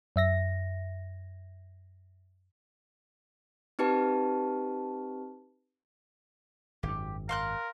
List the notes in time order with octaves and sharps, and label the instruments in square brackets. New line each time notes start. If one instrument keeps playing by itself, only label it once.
[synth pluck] F#2 E5 A#6
[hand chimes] C4 D#4 G4 B4 A5
[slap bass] G#1 F#2 [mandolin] G4
[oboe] A#4 [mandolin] F5 C6 F#6